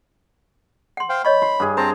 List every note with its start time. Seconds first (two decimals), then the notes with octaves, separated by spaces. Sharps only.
0.97 F#5 C6
1.09 C5 F5 G5
1.25 C#5 D#5 B5 C#6
1.42 C6
1.60 G2 G#4
1.77 C4 C5 A5 A#5